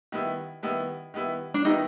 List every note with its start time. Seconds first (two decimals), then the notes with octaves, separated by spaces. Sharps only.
0.12 D#3 G3 B3 E4
0.63 D#3 G3 B3 E4
1.14 D#3 G3 B3 E4
1.54 D4
1.65 D#3 G3 B3 D#4 E4